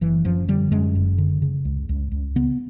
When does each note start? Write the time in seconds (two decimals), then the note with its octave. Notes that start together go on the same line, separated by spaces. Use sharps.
0.01 F#1 E3
0.25 F#2 F3
0.48 D3 G3
0.71 F#2 G#3
0.95 F#1
1.18 D3
1.42 C#3
1.65 C#2
1.89 C#2
2.12 C#2
2.36 C#3 B3